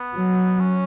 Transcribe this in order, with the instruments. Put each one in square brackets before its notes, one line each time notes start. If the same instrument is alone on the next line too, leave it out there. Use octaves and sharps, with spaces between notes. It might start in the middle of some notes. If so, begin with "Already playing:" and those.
Already playing: [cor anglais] B3
[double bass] F#3
[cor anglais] C#4